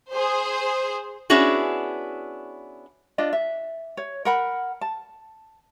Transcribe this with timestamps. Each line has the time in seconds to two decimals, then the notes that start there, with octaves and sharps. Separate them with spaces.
0.11 G#4 C5
1.30 B3 C#4 D4 E4 F#4 G#4
3.18 D4 F4 D#5
3.33 E5
3.97 C#5
4.25 A#4 F#5 B5
4.81 A5